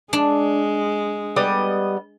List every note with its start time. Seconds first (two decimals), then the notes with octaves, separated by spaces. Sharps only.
0.13 G#3 D4
1.36 G3 B3 D#5